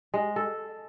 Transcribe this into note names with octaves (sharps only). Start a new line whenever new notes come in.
G#3
A4